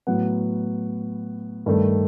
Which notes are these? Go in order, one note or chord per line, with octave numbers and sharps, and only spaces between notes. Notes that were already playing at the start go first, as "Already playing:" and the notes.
A2 F#3 B3 F#5
G2 D#3 A3